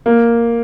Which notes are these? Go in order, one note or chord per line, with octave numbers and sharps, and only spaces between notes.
A#3